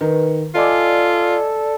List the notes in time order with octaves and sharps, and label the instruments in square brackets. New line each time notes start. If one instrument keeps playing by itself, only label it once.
[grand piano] D#3 [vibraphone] B4
[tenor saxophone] F4 [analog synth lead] A4 [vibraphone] D5 [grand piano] D#5 G#5 D6